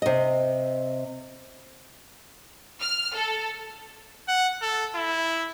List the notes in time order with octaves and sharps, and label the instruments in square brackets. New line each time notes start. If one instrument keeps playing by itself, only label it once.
[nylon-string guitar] C3 D#5
[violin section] F6
A4
[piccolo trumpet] F#5
A4
E4